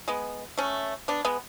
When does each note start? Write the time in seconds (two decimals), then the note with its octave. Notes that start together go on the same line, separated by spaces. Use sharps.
0.08 G#3 B3
0.57 A3 C#4
1.08 B3 D4
1.25 G#3 B3